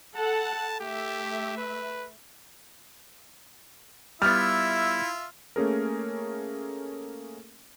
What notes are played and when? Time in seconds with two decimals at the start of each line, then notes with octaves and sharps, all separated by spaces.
0.16 A4 F#5 A5
0.80 A3 G4 E5
1.57 B4
4.22 G3 B3 E4 F4 E5 F6 A6
5.56 A3 A#3 C#4 G#4 A#4